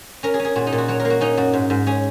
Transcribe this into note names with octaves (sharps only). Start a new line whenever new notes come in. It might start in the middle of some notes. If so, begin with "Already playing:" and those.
C#4 A#4
G#4
C#4
G#4
A#2 F#4
D#4
A#2
F#4
F#3 C#5
A#4
A#3
F#4
C#4 D#4
F#2 F#4
G#2
G#2
C#4 G#4